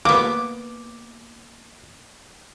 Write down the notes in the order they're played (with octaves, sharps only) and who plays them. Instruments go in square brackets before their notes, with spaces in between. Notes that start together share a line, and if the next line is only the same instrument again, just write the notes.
[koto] A#3 B3 [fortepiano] D6